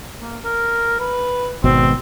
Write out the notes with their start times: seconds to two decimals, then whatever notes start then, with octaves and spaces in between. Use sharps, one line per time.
0.20 A#3
0.44 A#4
0.99 B4
1.64 G#1 B2 C4